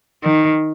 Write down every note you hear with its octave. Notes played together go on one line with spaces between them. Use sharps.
D#3